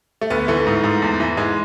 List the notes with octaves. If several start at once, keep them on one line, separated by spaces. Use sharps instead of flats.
A3
D2 B3
E3 A3
G#2
G#2
E2
E3
G#2 G#3